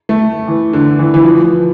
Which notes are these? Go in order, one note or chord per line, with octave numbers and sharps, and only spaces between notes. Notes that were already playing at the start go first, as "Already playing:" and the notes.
A3
E3
D3
E3
E3
F3